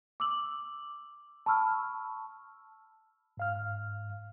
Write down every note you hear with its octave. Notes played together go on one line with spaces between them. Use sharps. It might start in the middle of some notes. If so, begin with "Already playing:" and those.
D6 E6 F#7
A5 B5 C#6 E6 F6
G#2 F5 F6